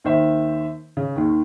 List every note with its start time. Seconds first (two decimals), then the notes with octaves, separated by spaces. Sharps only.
0.04 D#2 D#3 C5 E5
0.97 C#3
1.16 D#2 D#3